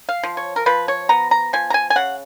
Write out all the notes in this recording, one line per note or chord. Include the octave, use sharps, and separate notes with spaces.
F5
F3
C#5
A#4
F3 B4
C#5
B3 A#5
A#5
F3 G#5
A#5
G#5
G#5
C#3 F#5